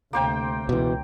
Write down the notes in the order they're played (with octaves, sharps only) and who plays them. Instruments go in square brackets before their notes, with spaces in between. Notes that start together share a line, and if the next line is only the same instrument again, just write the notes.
[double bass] D2 C3 [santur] A#3 C5 G5
[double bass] C#2 [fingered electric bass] B2 E3